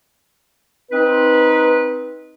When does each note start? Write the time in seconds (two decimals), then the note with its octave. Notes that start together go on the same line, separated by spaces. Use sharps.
0.92 C4 D#4 B4